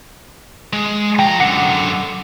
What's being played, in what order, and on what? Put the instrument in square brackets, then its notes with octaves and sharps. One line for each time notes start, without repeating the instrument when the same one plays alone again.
[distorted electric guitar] G#3
[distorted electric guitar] F3 A#5 [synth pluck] G5
[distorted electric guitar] F#2 D3 [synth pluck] F#5